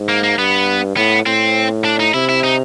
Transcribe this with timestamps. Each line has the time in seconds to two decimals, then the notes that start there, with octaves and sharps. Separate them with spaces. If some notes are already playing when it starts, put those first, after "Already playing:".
Already playing: G#2
0.09 A#3
0.23 A#3
0.38 G2 B3
0.97 A2 B3
1.26 A2 C4
1.84 D4
1.99 D#4
2.14 C3 E4
2.29 E4
2.44 D#4